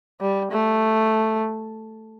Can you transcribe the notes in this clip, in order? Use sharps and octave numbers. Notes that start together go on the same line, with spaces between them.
G3
A3